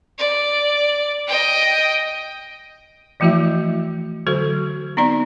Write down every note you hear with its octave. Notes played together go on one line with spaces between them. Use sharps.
D5
D#5 G5
E3 F3 A3 E4 F#4 E5
D3 F#3 F#4 A4
B3 C4 D#4 D5 A#5